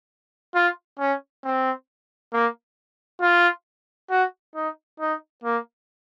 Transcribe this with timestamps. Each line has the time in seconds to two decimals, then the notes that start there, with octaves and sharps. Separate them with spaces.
0.54 F4
0.99 C#4
1.44 C4
2.33 A#3
3.21 F4
4.10 F#4
4.55 D#4
5.00 D#4
5.44 A#3